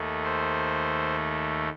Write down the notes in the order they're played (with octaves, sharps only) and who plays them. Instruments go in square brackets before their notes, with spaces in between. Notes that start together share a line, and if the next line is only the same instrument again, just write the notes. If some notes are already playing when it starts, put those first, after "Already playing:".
Already playing: [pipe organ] D#2 D#3 A3
C5